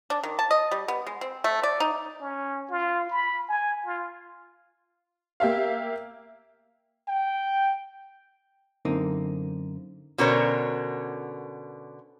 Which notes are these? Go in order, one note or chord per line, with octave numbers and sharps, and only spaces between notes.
D4
D#3
A5
D#5
G3
B3
G#3
C4
A3
D5
D#4
C#4
F4
B5
G#5
F4
A#3 G4 E5 F5
G5
F#2 D3 A#3 C4 D#4
B2 D3 C#4 A#4 C5 C#5